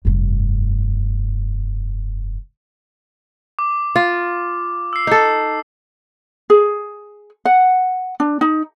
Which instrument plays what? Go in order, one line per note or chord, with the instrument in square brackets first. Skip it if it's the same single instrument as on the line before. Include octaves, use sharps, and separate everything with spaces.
[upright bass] F1 G2
[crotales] D6
[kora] F4
[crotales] E6 C7
[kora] D#4 A4
[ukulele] G#4
F#5
D4
D#4